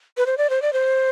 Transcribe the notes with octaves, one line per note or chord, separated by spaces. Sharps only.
B4
C5
D5
C5
D5
C5